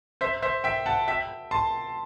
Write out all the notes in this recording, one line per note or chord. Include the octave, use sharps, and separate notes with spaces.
C5 E5
C5 E5
E5 G5
F#5 A5
E5 G5
A5 C6